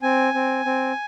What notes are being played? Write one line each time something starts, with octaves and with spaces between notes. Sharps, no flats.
C4 G#5
C4
C4